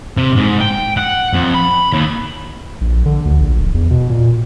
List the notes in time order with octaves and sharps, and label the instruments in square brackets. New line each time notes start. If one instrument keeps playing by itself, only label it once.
[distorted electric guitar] C3
G#2
G5
F#5
F2
B5
D#2
[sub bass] A#1
D3
D2
A#1
D1
E2
B2
A#2